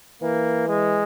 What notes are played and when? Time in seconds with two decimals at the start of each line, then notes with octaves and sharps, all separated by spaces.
0.22 E3 A#3
0.68 G#3